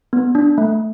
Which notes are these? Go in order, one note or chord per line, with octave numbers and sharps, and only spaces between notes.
B3
D4
A3